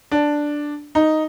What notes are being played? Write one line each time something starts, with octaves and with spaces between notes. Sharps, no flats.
D4
D#4